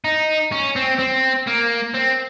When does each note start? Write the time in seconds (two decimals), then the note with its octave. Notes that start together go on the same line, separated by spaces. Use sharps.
0.05 D#4
0.52 C#4
0.76 C4
0.99 C4
1.47 A#3
1.94 C4